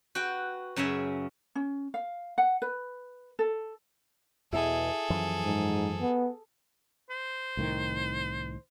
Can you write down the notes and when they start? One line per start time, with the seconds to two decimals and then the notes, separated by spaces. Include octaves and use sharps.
0.15 F#4 B4 G5
0.76 F#2 C#3 C#4 E5 G#5
1.55 C#4
1.94 F5
2.38 F#5
2.62 B4
3.39 A4
4.53 E2 B2 E4 G#4 A4
5.10 F#2 E3 F3
5.45 G#2
6.01 B3
7.10 C5
7.57 C2 A2 D#3